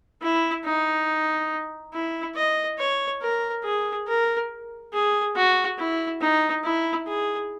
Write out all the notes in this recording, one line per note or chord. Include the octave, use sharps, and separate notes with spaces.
E4
D#4
E4
D#5
C#5
A#4
G#4
A#4
G#4
F#4
E4
D#4
E4
G#4